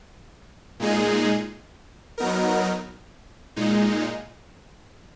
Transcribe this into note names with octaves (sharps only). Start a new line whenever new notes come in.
A#2 G#3 D#4 G#4
F#3 B3 D#4 A#4
A#2 G#3 D#4